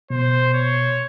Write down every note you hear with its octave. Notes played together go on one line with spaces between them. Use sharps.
B2 C5
C#5